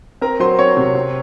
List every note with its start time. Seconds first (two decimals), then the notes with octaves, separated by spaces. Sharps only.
0.21 C4 A#4 A#5
0.40 F#3 C5 C6
0.58 C4 C#5 C#6
0.77 C3
0.95 C4